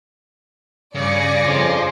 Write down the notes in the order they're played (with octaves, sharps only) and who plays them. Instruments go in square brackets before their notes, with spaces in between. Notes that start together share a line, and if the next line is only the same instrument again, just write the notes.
[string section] G2 D5 C#7 [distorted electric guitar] C#3 [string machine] G#5 D6 A#6
[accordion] F2 C#3 [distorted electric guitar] F4 C5